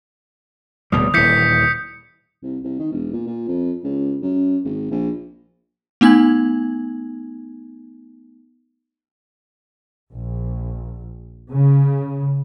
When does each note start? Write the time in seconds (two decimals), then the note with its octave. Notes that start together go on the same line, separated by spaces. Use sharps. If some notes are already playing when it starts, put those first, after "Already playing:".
0.92 D1 B2 G3 D#6
1.14 D#1 E3 G6 B6 C#7
2.43 C2
2.64 C2
2.79 D#3
2.92 E1
3.13 A#2
3.26 A#2
3.48 F2
3.83 C#2
4.22 F#2
4.65 G#1
4.91 A#1
6.01 A3 B3 D#4 G#5 G#6 F#7
10.12 A#1
11.51 C#3